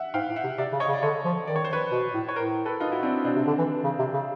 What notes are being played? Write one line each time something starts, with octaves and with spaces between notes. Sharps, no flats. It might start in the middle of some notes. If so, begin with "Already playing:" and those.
Already playing: E5 F#5
G#2 F5 G5
A2
E5 F#5
C3
C3 D5 E5
C#3
C#5 D#5
C#3
D5
D3 C#5 D#5
F3
D#3 D5
C#5
C5
B4 C#5
B2
A2
C#5
A2 A#4 C5
A4 B4
D#4 F4
E4 F#4
C4 D4
B2 C4 D4
C3
D3
E3
C#3
C3
C#3